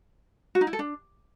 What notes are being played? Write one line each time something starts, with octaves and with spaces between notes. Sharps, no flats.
F#4
D#4
E4
A4
D4